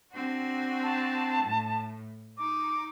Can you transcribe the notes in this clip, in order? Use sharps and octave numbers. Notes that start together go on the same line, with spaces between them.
C4 D4 F#4
A5
A2
D#4 D6